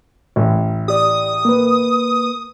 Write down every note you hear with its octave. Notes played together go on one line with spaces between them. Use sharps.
A1
G4 D5 D#6
A#3 B4